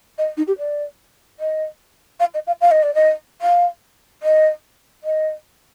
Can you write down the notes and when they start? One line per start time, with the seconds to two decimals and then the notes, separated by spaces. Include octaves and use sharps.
0.18 D#5
0.37 D#4
0.47 G4
0.58 D5
1.39 D#5
2.19 F5
2.34 D#5
2.47 F5
2.61 F5
2.71 D#5
2.82 D5
2.94 D#5
3.41 F5
4.22 D#5
5.03 D#5